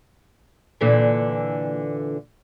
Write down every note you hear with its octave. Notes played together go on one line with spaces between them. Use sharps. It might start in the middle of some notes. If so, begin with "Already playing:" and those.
A#2 D3 E3